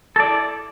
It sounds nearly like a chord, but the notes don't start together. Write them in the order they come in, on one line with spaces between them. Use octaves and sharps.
A4 D5 E4